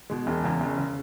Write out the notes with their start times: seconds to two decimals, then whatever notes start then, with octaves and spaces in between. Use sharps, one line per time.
0.10 B2 G#3
0.27 E1
0.44 E2 C#3
0.61 E1
0.77 C#3